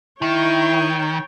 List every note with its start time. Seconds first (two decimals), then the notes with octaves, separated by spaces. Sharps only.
0.22 D#3 E4 C#5 G5